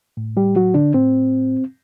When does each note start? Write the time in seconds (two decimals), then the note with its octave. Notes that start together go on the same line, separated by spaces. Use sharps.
0.17 A2
0.37 G3 G4
0.56 F#3 F#4
0.74 D3 D4
0.94 A2 C4